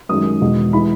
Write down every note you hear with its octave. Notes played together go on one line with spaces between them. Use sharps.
F#2 D#3 G#3 D#6
E2 B2 G#3
E3 G#3 B5